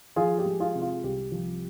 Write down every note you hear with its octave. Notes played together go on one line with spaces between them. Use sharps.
F3 F4 G#4
G4
G#3
F4 G#4
C3
F4
C2 G4
F3